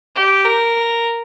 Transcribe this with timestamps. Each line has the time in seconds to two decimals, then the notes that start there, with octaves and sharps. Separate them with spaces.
0.15 G4
0.45 A#4